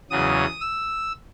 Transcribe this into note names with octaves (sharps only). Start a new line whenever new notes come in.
E2 C#3 F#3 D#6
E6